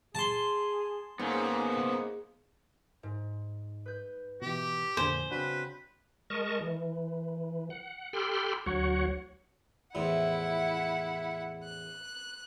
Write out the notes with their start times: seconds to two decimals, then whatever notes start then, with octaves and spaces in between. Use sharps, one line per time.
0.15 G#4 A5 C6
1.19 G#2 A#3 B3 C#4
3.03 G#2
3.86 B4 G6
4.42 B2 E3 F4 G4
4.97 F2 A#2 D3 C5 G#5
5.31 C#3 C4 D4 F#4 B4
6.30 G#3 A#4 D#5 A5 C#6
6.61 E3
7.70 F#5
8.13 G4 A4 G5 B5 C6 F6
8.66 D2 F#3 F#4 C#5 F#5
9.95 E2 A2 F3 E4 F#5
11.64 F#6